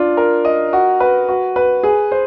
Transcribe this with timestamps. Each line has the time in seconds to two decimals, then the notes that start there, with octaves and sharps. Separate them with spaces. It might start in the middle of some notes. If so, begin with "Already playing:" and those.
Already playing: D4 F4
0.17 A#4
0.45 D#5
0.73 F#4
1.00 B4
1.29 F#4
1.56 B4
1.83 G#4
2.12 C5